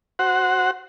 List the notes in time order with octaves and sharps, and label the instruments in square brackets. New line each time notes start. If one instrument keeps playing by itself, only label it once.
[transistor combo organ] F#4 C5 F#5